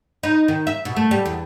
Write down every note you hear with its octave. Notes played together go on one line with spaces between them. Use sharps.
D#4
D#3
E5
B2
A3
G3
E2